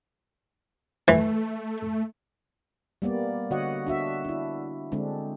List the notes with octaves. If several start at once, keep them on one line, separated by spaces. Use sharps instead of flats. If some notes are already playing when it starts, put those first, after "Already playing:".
E3 A3
G3 A#3 B3 D5
D3 F#4 C#5 D#5 F#5
D4 F#4 E5
D4 E4
D3 G#3 C4 D4